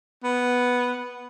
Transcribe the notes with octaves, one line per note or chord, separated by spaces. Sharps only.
B3